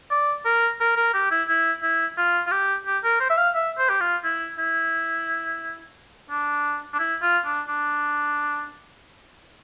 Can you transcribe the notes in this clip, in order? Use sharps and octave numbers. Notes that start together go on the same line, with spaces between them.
D5
A#4
A#4
A#4
G4
E4
E4
E4
F4
F4
G4
G4
A#4
C5
E5
F5
E5
C5
G4
F4
E4
E4
D4
D4
E4
F4
D4
D4